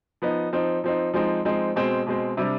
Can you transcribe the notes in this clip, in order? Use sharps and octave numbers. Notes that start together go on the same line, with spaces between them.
F3 B3 D#4
F3 C4 D#4
F3 C4 D#4
F3 G#3 C4 D#4
F3 G#3 C4 D#4
B2 G#3 C4
B2 G#3 C4
C3 G3 D4